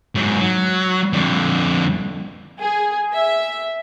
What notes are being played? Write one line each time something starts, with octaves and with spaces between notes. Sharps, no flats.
G#2 F#3
F#3
F2 D3
G#4
E5